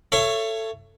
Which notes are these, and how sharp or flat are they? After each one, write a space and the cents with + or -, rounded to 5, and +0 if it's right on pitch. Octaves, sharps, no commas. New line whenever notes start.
A4 +10 C#5 +0 E5 +35